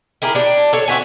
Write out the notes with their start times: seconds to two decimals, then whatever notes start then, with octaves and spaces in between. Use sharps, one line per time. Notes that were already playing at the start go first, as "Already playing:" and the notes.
0.22 E4 G4 G#4 A#4
0.35 D4 G4
0.73 A4 C#5
0.88 C4 F#4 E5 G#5